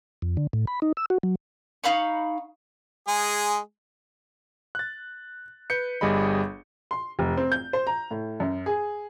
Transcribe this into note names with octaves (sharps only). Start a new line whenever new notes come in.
F2
D3
A2
B5
D#4
E6
F#4
F#3
D#4 F5 B5 C#6
G#3 G#4
F#6 A6
B4 G6 C#7
G1 G3 G#4 D#5 B5
C6
F1
C4
G6
C5
A#5
A2
F#2
G#4